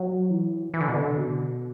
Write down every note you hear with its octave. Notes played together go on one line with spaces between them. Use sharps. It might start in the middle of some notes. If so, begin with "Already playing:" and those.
Already playing: F#3
E3
E3
D3
B2
D3
B2